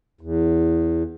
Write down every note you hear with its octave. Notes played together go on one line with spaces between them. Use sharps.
E2